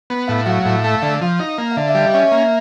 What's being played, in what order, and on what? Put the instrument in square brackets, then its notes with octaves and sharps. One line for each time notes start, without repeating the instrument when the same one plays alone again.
[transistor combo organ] B3
[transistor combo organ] A2 [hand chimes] F5
[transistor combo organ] F#3 [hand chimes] F5
[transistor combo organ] A2
A3
[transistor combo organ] D3 [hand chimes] F5
[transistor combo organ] F3
D#4
A#3
[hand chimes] F5
[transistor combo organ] D3 [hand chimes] E5
[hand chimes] E5
[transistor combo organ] G3
[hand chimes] D#5
[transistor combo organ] C#4 [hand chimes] E5
[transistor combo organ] A#3